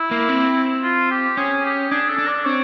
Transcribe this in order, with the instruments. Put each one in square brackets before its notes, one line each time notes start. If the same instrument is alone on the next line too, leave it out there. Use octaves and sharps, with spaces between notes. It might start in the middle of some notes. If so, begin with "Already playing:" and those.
Already playing: [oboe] E4
[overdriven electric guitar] A#3
C4
[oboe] F4
G4
[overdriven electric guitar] C#4 [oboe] G#4
[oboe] G4
[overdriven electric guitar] D4 [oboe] G#4
[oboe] A4
[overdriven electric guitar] D4
[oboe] D5
[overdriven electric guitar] C4 [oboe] C#5